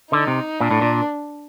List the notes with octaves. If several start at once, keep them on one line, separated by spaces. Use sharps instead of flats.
D3 D#4
C3
A#2 D4
A2
A#2